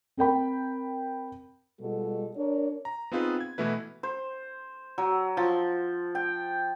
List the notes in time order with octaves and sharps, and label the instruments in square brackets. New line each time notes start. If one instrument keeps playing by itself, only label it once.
[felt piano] C4 A#4 G5 B5
[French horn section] B2 G3 G#3 F4 F#4 A4
D4 A#4 C#5
[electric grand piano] A#5
B3 C4 D#4 F4 G#4 B4
G#6
B2 E3 A3 E4 B4
[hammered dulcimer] C5
F#3
F3
G5